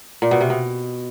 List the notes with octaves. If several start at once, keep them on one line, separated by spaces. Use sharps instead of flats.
A#2
B2
C3
B2